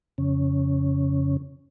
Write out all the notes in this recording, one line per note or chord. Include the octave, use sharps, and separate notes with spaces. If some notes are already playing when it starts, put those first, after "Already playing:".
F2 C#3 C#4